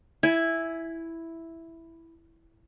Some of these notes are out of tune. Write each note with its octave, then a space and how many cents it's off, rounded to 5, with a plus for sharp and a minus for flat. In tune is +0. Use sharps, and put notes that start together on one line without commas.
E4 +0 G#5 +5